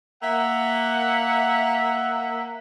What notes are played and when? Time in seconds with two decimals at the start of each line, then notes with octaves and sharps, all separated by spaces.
0.22 A#3 E5 F#5